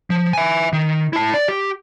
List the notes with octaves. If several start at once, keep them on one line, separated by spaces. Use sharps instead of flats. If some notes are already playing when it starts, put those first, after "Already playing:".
F3
E5 G#5
D#3
E4 A5
D5
G4